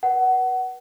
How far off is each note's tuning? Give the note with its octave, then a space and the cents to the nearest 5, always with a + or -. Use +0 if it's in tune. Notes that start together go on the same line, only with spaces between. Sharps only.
B4 -30 F#5 +20